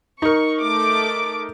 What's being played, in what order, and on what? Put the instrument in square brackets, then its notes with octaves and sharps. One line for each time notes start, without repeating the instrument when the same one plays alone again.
[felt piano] D#4 A#4 [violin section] C#6
[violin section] A3 D6